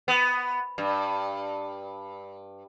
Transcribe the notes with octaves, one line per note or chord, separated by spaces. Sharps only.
B3
G2